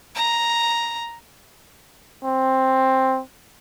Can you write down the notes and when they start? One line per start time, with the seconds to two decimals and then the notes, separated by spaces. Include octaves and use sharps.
0.15 A#5
2.24 C4